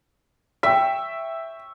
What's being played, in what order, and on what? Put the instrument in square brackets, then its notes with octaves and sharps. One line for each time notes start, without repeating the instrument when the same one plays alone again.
[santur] E5 C#6 [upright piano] G5 B6